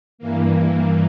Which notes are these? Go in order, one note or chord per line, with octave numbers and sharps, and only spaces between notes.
G2 E3 A#3